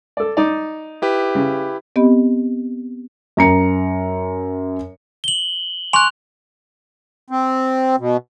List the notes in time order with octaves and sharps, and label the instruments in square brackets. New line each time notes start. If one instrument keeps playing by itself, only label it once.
[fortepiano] A4 D5
D#4 D5
[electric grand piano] E4 G4 B4
[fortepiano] C#3
[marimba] B3 C4 G4 D#5 B5
[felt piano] F#2 A#5 C#7
[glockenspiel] F#7 G7
[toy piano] G#5 C6 C#6 [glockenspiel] F#6 F7
[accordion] C4
B2